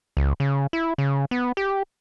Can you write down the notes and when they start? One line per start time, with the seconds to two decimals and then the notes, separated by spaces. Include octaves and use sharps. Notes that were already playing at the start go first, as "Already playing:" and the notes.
0.17 C#2
0.40 C#3
0.73 E4
0.98 C#3
1.31 B3
1.57 G4